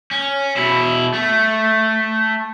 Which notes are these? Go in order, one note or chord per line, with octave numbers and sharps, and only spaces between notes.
C#4
B2 E4
A3